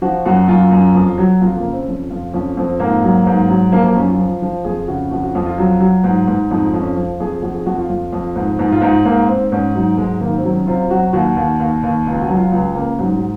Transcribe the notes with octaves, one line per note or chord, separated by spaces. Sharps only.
F3 F#4
F#2 F#4
F#2 F4
F#2
F2
F#3
F2 F4
A#3
C#3
C4
F2 C#4
F2 F4
F2 C#4
F2 C4
G#2 A#3
F#3
G#2
F#3
F3 A#3
A#3
F#2 C#4
F4
F3
F3
F2 G#4
C#3 F#4
F2 F#4
F#4
F2
F4
F#3
F#3
G#2
G#2
F2 D#4
F2
C#4
F3
F2 G#4
F2 F#4
G#4
F2 F#4
F4
F2
F2
G#2
G#2
F4
G#2 D#4
G#2 A#3
G#2 C4
G#2 C#4
F#3 D#4
G#2 G#3
D#3 A#3
C4
F#3
C#4
C3 F4
F#3 F#4
D#2 F#4
D#2
D#2
D#2
C#2 F4
F#4
F#3
F4
C#2
C#3 A#3
G#2 F#3
F#3